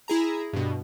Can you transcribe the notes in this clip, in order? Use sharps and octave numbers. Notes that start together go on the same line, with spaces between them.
E4 G#4 A#5
G2 B2